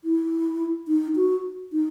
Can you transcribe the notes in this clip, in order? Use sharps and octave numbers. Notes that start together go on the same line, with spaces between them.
E4
D#4
F#4
D#4